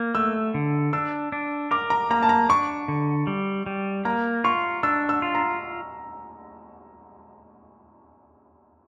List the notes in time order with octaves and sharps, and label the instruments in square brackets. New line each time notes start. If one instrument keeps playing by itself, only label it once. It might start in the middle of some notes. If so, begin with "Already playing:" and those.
Already playing: [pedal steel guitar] A#3
[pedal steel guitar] A3 [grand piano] E6
[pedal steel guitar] D3
[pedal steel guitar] D4 [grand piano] E6
[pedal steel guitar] D4
[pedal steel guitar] A#4 [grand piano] D6
[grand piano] A#5
[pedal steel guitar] A#3 [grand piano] A#5
[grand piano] A5
A#5
[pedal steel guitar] D4 [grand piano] C#6
[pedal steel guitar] D3
G3
G3
[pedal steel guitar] A#3 [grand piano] A#5
[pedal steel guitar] F4 [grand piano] C#6
[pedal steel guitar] D4 [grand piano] E6
[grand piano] E6
[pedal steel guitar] F4
[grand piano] A#5